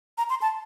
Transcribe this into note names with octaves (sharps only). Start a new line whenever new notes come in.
A#5
C6
A5